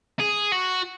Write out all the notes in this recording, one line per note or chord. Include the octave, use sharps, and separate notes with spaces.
G#4
F#4